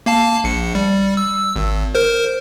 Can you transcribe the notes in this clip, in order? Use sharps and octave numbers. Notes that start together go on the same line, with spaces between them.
A#3 F5 A5
A#1 C#7
G3
E6
G#1
A#4 C5